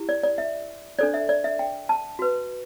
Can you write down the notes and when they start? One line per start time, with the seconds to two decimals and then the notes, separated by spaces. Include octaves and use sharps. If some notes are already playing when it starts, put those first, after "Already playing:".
Already playing: E4 G4
0.09 D5
0.23 D5
0.38 E5
0.99 D4 A4 C5 D5
1.14 E5
1.29 D5
1.44 E5
1.59 G5
1.89 A5
2.19 F#4 B4